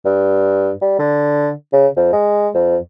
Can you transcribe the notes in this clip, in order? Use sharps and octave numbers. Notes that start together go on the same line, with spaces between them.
G2
G3
D3
C#3
F2
G#3
F2